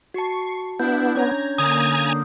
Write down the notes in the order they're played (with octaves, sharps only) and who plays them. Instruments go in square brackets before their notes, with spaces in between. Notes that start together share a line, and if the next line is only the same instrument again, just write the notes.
[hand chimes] F#4 A5 [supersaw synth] C#6 C7
[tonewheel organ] B3 [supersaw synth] D4 E4 [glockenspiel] G6
[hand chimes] C#4 D4 C#5 [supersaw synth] A#5 G#6
[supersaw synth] D3 A#3 [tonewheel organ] G#5 A#5 G#6 [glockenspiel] D#6